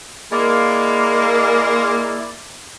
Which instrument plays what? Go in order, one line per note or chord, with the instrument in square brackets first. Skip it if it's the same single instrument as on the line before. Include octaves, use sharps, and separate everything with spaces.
[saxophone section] G#3 A#3 [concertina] E4 D5